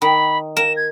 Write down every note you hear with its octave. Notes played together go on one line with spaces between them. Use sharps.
D#3 B5
A#4 E7
G#6